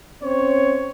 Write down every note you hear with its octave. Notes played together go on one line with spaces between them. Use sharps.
C4 C#4 C5 C#5